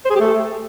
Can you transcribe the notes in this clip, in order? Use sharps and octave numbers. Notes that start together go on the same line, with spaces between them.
C5
G#4
G4
A3